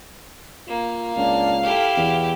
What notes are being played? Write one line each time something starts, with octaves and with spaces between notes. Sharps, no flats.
A#3 F4
C#2 D4 F5
E4 G4 A4
E2 B2